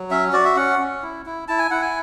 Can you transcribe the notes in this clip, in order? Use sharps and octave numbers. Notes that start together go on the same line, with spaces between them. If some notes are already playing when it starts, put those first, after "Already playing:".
Already playing: F#3
C#4 E5
F#4 D5
E5
C#4 F#5
C#4
E4
E4
E4 A5
G#5
E4 F#5
G#5